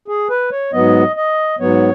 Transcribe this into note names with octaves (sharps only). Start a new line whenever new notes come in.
G#4
B4
C#5
G#2 F#3 B3 D#5
D#5
G#2 F#3 B3 C#5